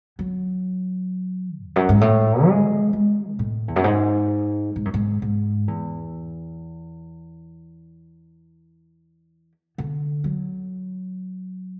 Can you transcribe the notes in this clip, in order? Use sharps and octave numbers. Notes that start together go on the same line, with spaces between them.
F#3
E2
F#2
G#2
A2
G#3
G#3
B2
A2
E2
F#2
G#2
G#2
F#2
G#2
G#2
E2
D3
F#3